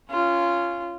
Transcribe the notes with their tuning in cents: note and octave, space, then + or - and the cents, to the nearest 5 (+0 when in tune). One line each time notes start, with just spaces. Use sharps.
C#4 +0 F4 -15